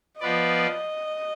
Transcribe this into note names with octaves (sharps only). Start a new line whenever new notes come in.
F3 B3 F4 B4 D5 D#5